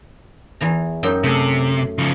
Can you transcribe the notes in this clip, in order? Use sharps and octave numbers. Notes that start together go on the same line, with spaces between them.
E2 E3 A#5
F#2 D#4 G5
C3 A3 G#4
C#3 F3